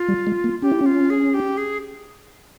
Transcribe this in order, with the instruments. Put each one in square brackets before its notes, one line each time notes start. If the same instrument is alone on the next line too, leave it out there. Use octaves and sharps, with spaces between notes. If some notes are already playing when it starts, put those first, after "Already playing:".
Already playing: [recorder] F4
[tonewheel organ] G3
G#3
A#3
[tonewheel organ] C#4 [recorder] G4
[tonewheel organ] E4
[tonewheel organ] C#4 [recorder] F4
[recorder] G#4
G4
G#4